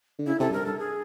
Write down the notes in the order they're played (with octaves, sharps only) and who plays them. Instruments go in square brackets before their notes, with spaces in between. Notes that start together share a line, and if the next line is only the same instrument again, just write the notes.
[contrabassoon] D3
[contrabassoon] C#3 [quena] E4
[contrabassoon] C3 [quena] A4
[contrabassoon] F#2
[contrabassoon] G2 [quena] A#4
[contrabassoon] G2 [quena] A4
[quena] G#4